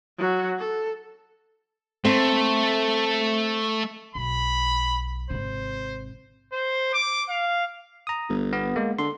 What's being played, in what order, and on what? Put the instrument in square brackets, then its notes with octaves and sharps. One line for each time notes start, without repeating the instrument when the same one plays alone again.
[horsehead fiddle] F#3 F#4
A4
[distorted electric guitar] A3 [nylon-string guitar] C4
[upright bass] B1 [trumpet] B5
[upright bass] G#1 C3 [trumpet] C5
[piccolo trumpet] C5
D6
F5
[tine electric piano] A#5 D#6
[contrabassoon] G1
[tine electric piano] B3
G#3 A#3
[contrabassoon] D3 [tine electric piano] C6